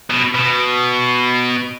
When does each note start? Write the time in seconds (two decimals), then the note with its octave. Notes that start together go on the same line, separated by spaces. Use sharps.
0.10 B2
0.35 B2